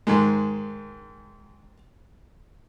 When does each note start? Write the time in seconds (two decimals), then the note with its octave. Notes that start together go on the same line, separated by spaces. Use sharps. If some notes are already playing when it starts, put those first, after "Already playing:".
0.07 G#2 D#3 G#3